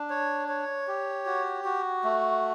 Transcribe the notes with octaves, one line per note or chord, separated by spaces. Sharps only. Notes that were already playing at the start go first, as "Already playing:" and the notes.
Already playing: D4
C#5
C#5
G4
F#4
F#4
A3